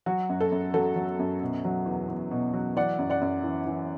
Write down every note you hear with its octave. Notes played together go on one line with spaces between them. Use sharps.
F#3 F#4
F#2
A4
F#2
F#3 A4
F#3
F#2
B2
F#3
E2
E2
B2
F#3
E3 D5 F#5
F#2
D5 F#5
F#2
E3
E3